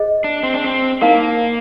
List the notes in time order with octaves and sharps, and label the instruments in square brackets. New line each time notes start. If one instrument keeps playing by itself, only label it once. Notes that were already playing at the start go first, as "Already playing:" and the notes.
Already playing: [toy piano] G#4 C5 D#5
[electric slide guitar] D4
C4
D4
C4
[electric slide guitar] A#3 [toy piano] D#4 A#4 F5